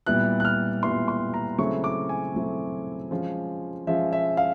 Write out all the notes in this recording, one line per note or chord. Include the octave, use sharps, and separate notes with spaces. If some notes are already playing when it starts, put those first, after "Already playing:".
A#2 G3 B3 E4 F#6
F#6
F6
A#2 G3 B3 E4 C6
C6
A#5
C#3 F#3 A3 C4 E4 C#6
D6
G#5
C#3 F#3 A3 C4 E4
F3 G#3 C#4 F4
F3 G#3 C#4 F4 E5
E5
F5